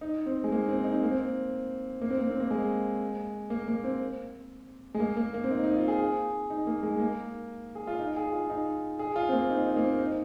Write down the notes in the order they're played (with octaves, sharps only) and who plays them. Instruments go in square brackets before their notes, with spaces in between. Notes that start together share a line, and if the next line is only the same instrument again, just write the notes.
[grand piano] D#4
C4
G#3
A#3
C4
D#4
C4
A#3
C4
A#3
C4
A#3
C4
A#3
G#3
A#3
A#3
C4
G#3
A#3
A#3
A#3
C4
D#4
D#4
F4
G#4
D#4
A#3
G#3
A#3
G#4
F4
D#4
G#4
F4
D#4
G#4
F4
C4
A#3
D#4
D#4
A#3
C4
D#4